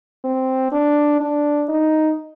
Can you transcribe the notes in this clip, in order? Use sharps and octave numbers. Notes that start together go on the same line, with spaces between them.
C4
D4
D4
D#4